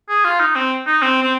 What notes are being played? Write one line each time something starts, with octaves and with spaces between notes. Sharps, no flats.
G#4
F4
D#4
C4
D#4
C4
C4